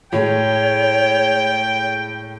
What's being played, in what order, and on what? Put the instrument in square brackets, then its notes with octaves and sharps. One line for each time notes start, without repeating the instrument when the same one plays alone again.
[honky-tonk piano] A2 G#3 [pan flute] C#5 [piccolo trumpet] G5